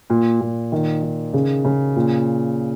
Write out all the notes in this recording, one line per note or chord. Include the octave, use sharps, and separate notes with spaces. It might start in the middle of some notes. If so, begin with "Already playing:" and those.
A#2
A#2
D#3
D#3
C#3
C#3
A#2